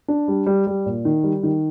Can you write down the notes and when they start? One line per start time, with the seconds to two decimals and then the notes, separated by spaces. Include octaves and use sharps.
0.08 D4
0.28 G3
0.46 G3
0.67 G3
0.86 A#2
1.05 D#3
1.24 G3
1.43 D#3